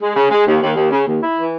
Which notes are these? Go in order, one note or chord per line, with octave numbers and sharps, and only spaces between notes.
G#3
C#3
G#3
D#2
D#2
D#2
C#3
D#2
E4
E3